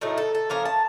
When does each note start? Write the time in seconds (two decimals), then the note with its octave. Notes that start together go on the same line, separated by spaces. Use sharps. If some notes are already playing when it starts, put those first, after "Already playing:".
0.01 A2 F#3 A3 D#4 A#4
0.18 A4
0.35 A4
0.50 F3 A#3 C#4 A#4
0.65 A5